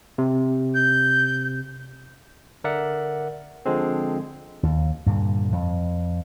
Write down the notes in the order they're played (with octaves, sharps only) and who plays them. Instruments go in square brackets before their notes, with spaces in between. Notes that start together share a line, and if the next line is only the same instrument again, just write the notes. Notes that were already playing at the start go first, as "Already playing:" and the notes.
[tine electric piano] C3
[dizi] G6
[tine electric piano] D3 A#4 D5 E5 F#5
D3 F3 G#3 C4
[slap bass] D#2
G2 A#2 D3
F2